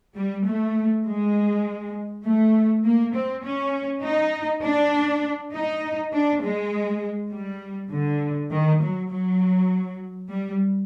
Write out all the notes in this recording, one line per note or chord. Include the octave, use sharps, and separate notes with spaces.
G3
A3
G#3
A3
A#3
C4
C#4
D#4
D4
D#4
D4
G#3
G3
D3
D#3
F#3
F#3
G3